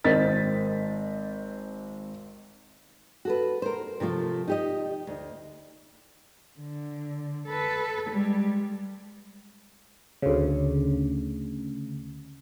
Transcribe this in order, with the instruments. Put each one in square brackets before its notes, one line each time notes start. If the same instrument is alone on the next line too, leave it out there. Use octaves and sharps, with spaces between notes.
[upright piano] G#1 C4 D#5 A6 B6
[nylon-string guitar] F#4 A4 B4
A#4 C5
C3 F3 A3 F4
D#4 G4 D#5
D2
[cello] D3
A4 B4
G3 G#3
[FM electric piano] D2 C#3